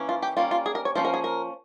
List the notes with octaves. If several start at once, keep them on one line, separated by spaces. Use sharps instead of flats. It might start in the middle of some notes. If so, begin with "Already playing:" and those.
Already playing: E3 A#3 C#4
F4
G4
G3 A#3 C#4 F4
F4
G#4
A#4
C#5
F3 A#3 C#4 C5
A#4
G#4
A#4